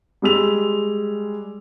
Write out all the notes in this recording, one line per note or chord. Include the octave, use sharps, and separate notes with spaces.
G3 G#3 E6 F7